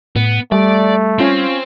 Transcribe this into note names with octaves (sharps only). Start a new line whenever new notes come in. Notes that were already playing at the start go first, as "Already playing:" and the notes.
A2 B3
G3 A3 D5
C4 C#4 F4 C6